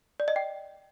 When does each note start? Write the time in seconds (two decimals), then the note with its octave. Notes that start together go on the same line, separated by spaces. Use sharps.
0.20 D5
0.28 D#5
0.36 G5